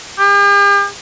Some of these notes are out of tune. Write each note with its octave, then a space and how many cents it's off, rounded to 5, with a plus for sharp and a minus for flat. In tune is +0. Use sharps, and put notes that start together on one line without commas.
G4 +45